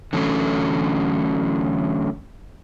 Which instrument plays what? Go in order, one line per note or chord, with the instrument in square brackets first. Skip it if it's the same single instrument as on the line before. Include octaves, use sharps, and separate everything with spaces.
[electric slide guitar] D3 E3 F#3 A3 C#4